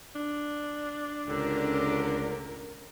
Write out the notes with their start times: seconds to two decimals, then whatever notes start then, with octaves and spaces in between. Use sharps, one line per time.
0.16 D4
1.27 C#2 A2 D3 C#4 G4 A#4